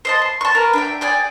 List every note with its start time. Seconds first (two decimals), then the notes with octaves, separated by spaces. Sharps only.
0.05 C5 D#5 A5
0.22 C6
0.41 A5 C#6
0.55 A#4 B4
0.73 D4 E5 G5
1.01 G#4 D5 G5 G#5